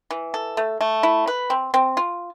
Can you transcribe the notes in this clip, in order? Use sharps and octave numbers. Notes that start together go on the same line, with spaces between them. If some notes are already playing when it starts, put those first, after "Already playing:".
E3
A4
A3
A3
E4
B4
C4
C4
F4